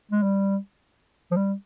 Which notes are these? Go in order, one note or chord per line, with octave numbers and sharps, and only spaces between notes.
G#3
G3
F3
G3